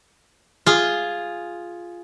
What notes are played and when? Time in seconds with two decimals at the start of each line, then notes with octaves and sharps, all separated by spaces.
0.66 F4 G#4